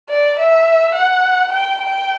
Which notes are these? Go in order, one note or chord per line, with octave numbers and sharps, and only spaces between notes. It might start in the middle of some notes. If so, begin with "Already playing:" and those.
D5
E5
F#5
G5
G5